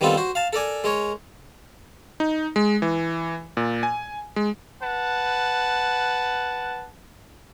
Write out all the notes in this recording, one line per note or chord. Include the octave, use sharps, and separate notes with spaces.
D#3 G3 B3 C4 F4 A4
F#4 C5
F5 A5
A4 A#4 D5 G#5
G#3 A#4 C#5
D#4
G#3
E3
A#2
G#5
G#3
B4 F#5 A5